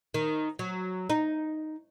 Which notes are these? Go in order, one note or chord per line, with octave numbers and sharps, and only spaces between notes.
D#3
F#3
D#4